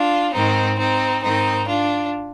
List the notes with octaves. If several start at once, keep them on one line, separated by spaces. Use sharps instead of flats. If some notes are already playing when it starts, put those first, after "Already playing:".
Already playing: D4 F4
G#2 D#3 C4 D#4
C4 D#4
G#2 D#3 C4 D#4
D4 F4